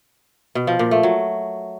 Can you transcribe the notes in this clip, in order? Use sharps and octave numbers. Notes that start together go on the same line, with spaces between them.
B2
F3
A#2
A3
F#3